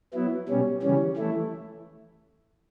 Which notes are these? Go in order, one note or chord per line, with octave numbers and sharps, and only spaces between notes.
F#3 B3 E4
B2 G3 C#4
C#3 E3 G3 C#4
E3 A3 E4